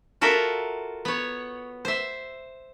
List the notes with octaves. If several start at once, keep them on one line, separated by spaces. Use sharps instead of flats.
F4 F#4 A4 A#4 E5
B3 C#5
C5 E5